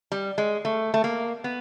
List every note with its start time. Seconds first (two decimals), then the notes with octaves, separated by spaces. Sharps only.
0.12 G3
0.38 G#3
0.65 A3
0.94 A3
1.04 A#3
1.44 B3